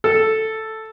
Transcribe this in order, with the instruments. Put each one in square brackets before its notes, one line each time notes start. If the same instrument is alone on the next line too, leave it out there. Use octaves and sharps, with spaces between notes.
[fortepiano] A4